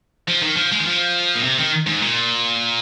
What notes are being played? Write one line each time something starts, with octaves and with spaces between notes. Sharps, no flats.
F3
D#3
F3
G#3
D#3
F3
A#2
C3
D#3
G#2
A#2